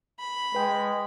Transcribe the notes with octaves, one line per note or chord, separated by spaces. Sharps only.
B5
G#3 B4 G5